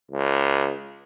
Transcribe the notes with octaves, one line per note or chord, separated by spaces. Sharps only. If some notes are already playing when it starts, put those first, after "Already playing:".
C#2